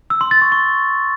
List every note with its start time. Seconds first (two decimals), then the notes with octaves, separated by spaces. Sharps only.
0.10 E6
0.21 C6
0.31 A6
0.42 C#6
0.52 C#6